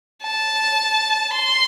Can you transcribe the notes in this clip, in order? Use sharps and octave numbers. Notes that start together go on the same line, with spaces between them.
A5
C6